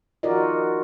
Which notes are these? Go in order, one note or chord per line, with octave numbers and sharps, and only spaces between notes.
D#4 F4 F#4 A#4 D5 D#5